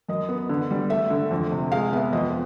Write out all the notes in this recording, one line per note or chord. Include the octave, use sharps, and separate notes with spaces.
F#2 D#5
B3
D3
G3
A3 E5
D3
F2
C3
G#3 F5
B3 E5
F2 D#5